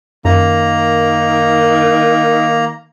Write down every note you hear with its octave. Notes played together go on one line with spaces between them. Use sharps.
F#2 D#3 A#3 A#5